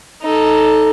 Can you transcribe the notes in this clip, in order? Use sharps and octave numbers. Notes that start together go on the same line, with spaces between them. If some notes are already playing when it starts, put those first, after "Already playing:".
D#4 A4